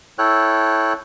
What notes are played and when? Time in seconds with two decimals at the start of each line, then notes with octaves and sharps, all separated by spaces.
0.19 E4 A4 C#5 G5 F#6